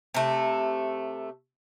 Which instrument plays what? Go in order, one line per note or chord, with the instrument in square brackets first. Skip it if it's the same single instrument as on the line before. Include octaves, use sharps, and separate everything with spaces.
[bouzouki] C3 A3